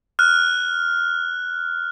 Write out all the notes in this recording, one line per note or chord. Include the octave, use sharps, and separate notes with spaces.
F6 F#6